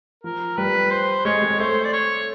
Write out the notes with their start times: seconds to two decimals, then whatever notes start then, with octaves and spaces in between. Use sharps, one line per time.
0.24 F3 A#4
0.57 G3 B4
0.91 C5
1.25 G#3 C#5
1.42 G#3
1.59 A3 C5
1.84 D5
1.93 C#5